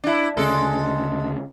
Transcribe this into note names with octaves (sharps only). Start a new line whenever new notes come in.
D4 E4
D2 C#3 G#3 A4